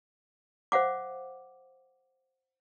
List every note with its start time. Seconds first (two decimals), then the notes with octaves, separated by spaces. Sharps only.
0.72 C5 F5 F#5 D6